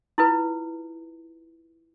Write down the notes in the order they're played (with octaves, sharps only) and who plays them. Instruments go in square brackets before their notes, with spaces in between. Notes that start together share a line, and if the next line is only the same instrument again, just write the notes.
[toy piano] E4 F4 B4